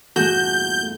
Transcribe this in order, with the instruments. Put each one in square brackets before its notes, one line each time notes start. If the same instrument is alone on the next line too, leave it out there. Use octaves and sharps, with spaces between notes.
[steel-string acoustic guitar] E2 G2 A#2 [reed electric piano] A3 G#4 A4 [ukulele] F#4 [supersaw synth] G6